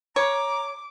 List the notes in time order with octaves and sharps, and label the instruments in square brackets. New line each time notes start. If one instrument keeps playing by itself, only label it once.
[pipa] C#5 [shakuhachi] A#5 [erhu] D6